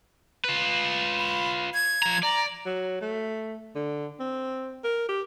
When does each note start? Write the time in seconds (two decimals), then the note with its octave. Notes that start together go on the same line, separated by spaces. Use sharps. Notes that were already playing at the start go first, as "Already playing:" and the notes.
0.44 F4 B4
1.19 B5
1.74 G#6
2.03 F3 A#5
2.23 D5 A#5
2.66 F#3
3.01 A3
3.75 D3
4.20 C4
4.84 A#4
5.09 G4